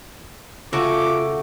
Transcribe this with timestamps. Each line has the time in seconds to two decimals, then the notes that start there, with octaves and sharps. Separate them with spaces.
0.73 C#3 A3 F4 F#4 D6